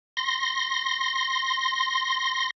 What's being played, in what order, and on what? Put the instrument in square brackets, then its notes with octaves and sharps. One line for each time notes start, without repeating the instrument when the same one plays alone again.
[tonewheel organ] C6 A#6